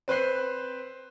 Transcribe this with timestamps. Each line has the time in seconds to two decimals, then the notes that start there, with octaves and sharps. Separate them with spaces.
0.08 C4 B4 C5 F#6 C7